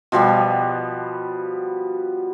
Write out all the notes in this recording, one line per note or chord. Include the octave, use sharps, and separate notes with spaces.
B2 F3 G3 B3